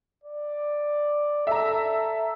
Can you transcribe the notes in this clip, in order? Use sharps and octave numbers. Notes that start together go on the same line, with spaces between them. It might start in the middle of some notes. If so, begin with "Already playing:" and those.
D5
A4 E5 A#5